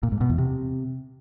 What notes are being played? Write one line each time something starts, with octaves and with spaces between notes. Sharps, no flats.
A#2
G#2
B2
E2
C3